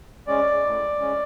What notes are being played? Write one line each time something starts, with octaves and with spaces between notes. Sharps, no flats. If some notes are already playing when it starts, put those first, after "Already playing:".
G#3 C#4 D5
A2
G#3 C#4